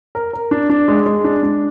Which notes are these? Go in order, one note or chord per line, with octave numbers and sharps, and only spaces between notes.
A#4
A#4
D4
D4
G#3
G#3
D4
D4